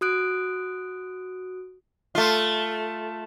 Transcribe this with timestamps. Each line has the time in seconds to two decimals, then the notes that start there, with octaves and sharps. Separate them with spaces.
0.01 F#4 D#6 F#6 D7
2.15 A3 F4